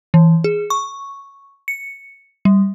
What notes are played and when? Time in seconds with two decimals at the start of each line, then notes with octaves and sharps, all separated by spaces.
0.14 E3
0.44 G#4
0.70 C#6
1.68 C#7
2.45 G3